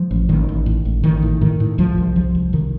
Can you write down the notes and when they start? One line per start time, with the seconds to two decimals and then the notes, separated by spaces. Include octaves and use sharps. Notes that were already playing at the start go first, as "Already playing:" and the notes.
Already playing: F3
0.11 A1
0.29 A1 D#3
0.49 A1
0.66 A2
0.85 A1
1.04 A1 D#3
1.23 A2
1.41 A2 D#3
1.60 A2
1.78 C2 F3
1.98 C2
2.16 C2 F3
2.35 C2
2.53 C2 D#3